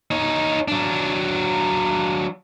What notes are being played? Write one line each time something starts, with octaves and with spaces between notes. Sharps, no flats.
D#4 C#5
F#3 D4